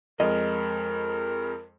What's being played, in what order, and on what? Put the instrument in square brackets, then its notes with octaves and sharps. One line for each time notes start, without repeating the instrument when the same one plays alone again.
[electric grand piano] F2 G#3 [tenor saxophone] A#4 [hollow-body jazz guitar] D#5